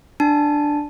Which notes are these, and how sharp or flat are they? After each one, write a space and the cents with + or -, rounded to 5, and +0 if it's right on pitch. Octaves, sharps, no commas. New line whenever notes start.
D4 +5 A5 +0